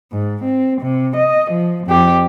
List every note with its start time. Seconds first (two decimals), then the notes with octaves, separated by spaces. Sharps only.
0.12 G#2
0.44 C4
0.82 C3
1.16 D#5
1.51 F3
1.88 F2 G4